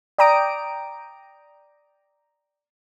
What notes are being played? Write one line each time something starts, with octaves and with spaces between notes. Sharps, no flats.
D5 G5 A#5 D#6 D7